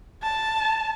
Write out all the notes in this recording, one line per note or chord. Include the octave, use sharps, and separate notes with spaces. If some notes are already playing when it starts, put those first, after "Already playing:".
A5